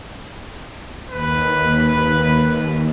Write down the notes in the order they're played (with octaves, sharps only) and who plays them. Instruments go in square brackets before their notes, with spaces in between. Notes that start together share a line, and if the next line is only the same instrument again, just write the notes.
[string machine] D#2 [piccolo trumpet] B4